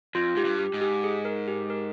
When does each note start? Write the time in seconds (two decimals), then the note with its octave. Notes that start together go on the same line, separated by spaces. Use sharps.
0.15 F2 F4
0.36 G#2 G4
0.45 G2
0.59 G4
0.74 G#2
0.81 G4
1.04 G#4
1.25 A#4
1.48 G4
1.70 A#4